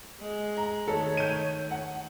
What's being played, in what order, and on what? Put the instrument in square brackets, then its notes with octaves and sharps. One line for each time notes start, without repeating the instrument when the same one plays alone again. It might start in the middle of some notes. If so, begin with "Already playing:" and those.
[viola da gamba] G#3
[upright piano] A#5
[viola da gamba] D#3 A3 [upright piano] A4 [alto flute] C#5
[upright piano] G6 D#7
F#5